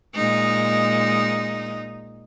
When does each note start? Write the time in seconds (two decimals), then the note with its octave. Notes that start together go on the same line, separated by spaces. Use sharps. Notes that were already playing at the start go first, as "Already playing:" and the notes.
0.15 A#2 G#3 D#4